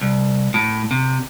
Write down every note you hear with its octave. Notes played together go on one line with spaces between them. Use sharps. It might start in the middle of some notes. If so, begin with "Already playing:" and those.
C2
A2
C3